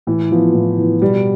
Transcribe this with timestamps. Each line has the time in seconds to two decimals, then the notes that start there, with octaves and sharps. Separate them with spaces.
0.07 A2 E3
0.31 E3 F3 B3 F4
0.54 A2
0.78 E3 B3 F4
1.01 B2 G3